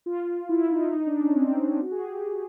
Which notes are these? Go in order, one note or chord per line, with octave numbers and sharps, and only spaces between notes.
F4
E4
D#4
D#4
D4
C#4
C4
C#4
C#4
F#4
G#4
G4